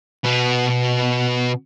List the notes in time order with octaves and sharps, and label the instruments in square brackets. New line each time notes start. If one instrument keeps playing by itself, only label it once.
[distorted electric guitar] B2 B3